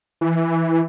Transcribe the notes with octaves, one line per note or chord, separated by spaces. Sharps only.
E3